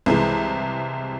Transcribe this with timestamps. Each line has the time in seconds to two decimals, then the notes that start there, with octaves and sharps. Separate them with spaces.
0.06 C2 C3 E3 G#3